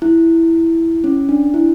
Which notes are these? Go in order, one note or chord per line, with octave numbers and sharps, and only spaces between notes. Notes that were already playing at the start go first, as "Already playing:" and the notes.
E4
C#4
D4
E4